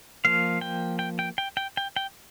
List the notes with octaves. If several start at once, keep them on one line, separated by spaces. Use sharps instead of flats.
F3 A#3 F5
G5
G5
G5
G5
G5
G5
G5